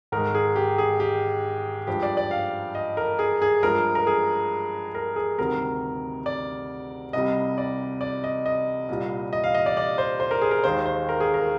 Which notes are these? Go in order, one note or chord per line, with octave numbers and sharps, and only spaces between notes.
G#2 D#3 G#3 A#4
G#4
G4
G#4
G4
G2 F3 G#3 G4
D5
D5
F5
D#5
A#4
G#4
G#4
G2 F3 G#3 A#4
A#4
G#4
A#4
G#4
D2 C3 D#3 G3 A#4
D5
C2 C3 G3 D#5
D5
D5
D#5
D#5
C2 A#2 G3
D#5
F5
D#5
D5
D5
C5
C5
A#4
G#4
A#4
D#2 D#3 G#3 C5
C5
A#4
G#4
A#4